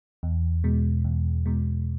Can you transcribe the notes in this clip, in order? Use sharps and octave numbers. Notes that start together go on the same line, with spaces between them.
E2
B2 G#3
E2
B2 G#3